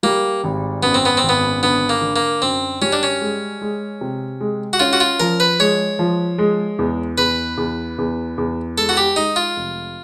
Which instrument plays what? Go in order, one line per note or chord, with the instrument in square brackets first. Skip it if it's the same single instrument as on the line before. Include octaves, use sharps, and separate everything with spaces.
[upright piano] G3 [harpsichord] A#3
[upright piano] G#1
[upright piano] F#2 [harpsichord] B3
[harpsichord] C4
B3
C4
[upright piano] G#1
[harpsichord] B3
[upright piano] D3 [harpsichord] B3
[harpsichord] A#3
[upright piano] D3
[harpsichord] A#3
[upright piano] F#2 [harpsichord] C4
[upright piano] G3 [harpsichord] C#4
[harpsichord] D4
C#4
[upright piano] G#3
G#3
C3
G#3
[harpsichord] F#4
[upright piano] C#4 [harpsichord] F4
[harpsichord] F#4
F4
[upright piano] F3 [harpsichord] A#4
[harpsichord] B4
[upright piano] G#3 [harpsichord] C#5
[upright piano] F3
G#3
E2
[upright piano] E2 [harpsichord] B4
[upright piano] E2
E2
E2
[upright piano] G#3 [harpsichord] A4
[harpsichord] F#4
G4
[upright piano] G#3 [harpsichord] D#4
[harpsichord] F4
[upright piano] F1